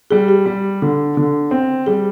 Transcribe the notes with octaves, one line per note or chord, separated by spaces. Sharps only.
G3 G#4
G4
G3
D3
D3
C4
G3 G#4